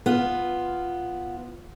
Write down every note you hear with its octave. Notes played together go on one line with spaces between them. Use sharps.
B3 F4